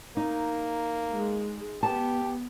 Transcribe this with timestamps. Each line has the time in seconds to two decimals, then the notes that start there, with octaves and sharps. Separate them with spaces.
0.17 A#3 D#4
1.11 G#3
1.83 B3 G4 A5